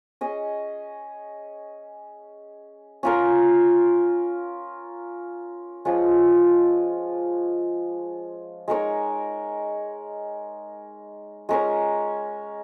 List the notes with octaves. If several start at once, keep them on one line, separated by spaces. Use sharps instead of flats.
C#4 G#4 D#5
C#4 F4 A#4
F3 G#3 C#4 F4
G#3 D#4 A#4 C#5
G#3 C#4 A#4 C#5